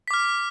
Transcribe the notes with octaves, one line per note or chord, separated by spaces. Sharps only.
D6 F6 B6